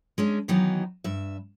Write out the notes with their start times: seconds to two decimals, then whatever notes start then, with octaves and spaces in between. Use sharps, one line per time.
0.18 G#3 C#4 D4
0.48 D#3 E3 F#3 B3 D#4
1.04 G2 E5